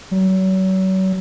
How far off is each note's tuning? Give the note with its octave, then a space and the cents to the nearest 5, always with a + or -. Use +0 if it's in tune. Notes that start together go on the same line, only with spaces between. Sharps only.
F#3 +35